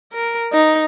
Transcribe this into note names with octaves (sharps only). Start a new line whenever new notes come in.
A#4
D#4